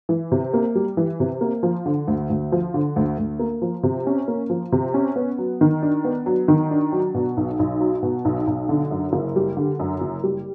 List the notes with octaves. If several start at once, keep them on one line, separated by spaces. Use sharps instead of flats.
E3
C3
A#3
G3
E3
C3
A#3
F3
D3
D2
D2
F3
D3
D2
D2
A#3
F3
C3
C#4
A#3
F3
C3
C#4
B3
F#3
D#3
D4
B3
F#3
D#3
D4
F#3
B2
B1
B1
F#3
B2
B1
B1
D3
F#2
F#1
G3
D3
F#2
F#1
G3